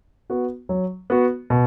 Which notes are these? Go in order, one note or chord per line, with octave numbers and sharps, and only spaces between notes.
B3 F#4
F#3
B3 F#4
B2